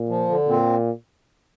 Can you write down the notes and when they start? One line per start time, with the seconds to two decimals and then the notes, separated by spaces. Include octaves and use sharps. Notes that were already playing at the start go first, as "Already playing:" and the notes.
Already playing: A#2
0.09 F3
0.29 D3
0.48 A#2 C4